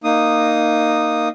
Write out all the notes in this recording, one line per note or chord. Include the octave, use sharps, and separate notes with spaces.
A#3 D#4 D#6